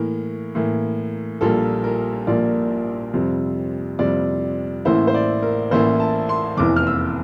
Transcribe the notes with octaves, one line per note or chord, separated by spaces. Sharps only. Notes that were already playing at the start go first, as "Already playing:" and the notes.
Already playing: A2 E3 A#3 A#4
A2 E3 A#3
A#1 A#2 G3 A#3 A4
A#4
A#1 A#2 G3 A#3 D5
F2 C3 G3
F2 C3 G3 D5
A1 A2 E3 A#3 E4 C5
C5
D5
A#4
A1 A2 E3 A#3 E4 C5
A5
C6
F1 E2 E3 D6
F6
E6